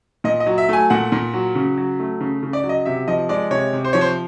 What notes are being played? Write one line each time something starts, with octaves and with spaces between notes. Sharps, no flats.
A#2 D#5
D#5
F#3
E5
A3 G#5
A#2 F#5
A#2
F#3
C#3
F#3
A3
C#3
C#3
D5
F#3
D#5
C3 E5
F3 D#5
G#3 D5
C3 C#5
C3
C5
F3 C#5
C5